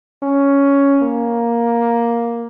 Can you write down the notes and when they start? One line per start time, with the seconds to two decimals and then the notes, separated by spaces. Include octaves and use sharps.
0.23 C#4
1.02 A#3